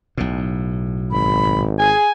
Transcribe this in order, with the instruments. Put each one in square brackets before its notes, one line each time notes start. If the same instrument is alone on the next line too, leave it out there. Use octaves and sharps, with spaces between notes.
[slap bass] B1 A2
[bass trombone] G#1 [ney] B5
[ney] G#4 [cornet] G#5